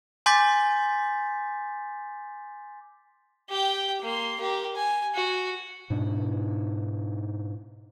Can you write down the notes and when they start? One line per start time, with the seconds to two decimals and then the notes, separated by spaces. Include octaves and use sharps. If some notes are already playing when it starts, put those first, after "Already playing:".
0.26 G#5 C6 D6 G6 A6 B6
3.50 G4 G5
4.02 A#3 C6
4.40 G4 A#4
4.76 G#5
5.14 F#4
5.90 G#2 B2 D4